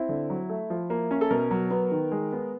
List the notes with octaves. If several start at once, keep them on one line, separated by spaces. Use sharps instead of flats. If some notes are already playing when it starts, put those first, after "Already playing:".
Already playing: C4 E4
D3
F#3
A3
F3
A#3
C#4
A4
B2 A#4
F#3
B3
D#3
G#3
B3